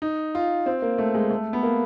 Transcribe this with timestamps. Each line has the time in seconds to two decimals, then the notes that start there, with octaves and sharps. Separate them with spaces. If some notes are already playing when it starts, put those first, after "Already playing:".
0.02 D#4
0.35 F4
0.66 C4
0.82 A#3
0.98 A3
1.15 G#3
1.30 A3
1.53 B3
1.63 A#3